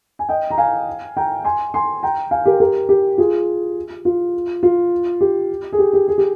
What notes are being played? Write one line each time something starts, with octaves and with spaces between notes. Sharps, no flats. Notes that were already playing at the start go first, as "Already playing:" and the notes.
G#5
D#5 G5
A#5
F5 G#5
G5 A#5
G#5 C6
G#5 C6
G5 A#5
F5 G#5
G4 A#4
G4 A#4
G4
F4 G#4
F4
F4
G4
G#4
G4
G4
G#4
G4